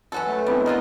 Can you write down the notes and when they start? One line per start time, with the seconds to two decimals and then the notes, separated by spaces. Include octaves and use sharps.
0.12 F#2 E3 C#4 F#4 A4
0.27 A3
0.46 G3 G#3 B3 C4 D4 E4
0.66 F4 F#4 A#4 D#5